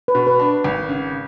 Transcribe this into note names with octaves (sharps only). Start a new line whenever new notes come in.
B4
B2
B4
D4
G#1
C#3